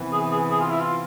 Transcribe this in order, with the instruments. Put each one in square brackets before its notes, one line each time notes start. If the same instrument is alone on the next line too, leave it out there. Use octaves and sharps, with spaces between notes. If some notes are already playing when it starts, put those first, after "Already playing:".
Already playing: [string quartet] C3 E3 B3
[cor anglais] G#4
G#4
G#4
F4
E4
F4